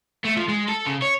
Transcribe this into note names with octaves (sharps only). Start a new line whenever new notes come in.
A3
F3
G#3
A4
C#3
C#5